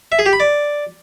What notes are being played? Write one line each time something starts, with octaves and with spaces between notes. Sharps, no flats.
E5
G#4
G4
B5
D5